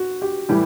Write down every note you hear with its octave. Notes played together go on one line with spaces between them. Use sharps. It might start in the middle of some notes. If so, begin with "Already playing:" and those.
Already playing: F#4
G4
A2 E3 G3 G4